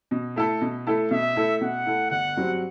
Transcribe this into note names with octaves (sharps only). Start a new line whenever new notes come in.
B2
A3 E4 A4
B2
A3 E4 A4
B2 E5
A3 E4 A4
B2 F#5
A3 E4 A4
G1 F#5
G2 F#3 C4